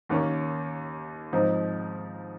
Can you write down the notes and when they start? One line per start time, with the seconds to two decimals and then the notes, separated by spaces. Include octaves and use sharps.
0.09 D#2 D#3 A#3 C#4
1.33 G#2 F3 C4 D#4